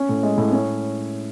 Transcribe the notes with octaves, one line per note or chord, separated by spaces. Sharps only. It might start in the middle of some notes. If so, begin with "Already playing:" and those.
Already playing: C#4
A2
G#3
A2
C#4